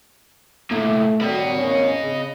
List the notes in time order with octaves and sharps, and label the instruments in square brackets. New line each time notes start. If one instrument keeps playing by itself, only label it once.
[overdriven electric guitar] A2 A#3 [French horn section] A3
[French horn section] D#3 F#3 G3 [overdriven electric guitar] D#5 B5
[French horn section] E2 A#3 C#4
C#3